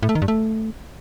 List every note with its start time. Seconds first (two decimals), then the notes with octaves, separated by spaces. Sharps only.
0.03 A2
0.09 A3
0.15 D#3
0.22 G2
0.28 A3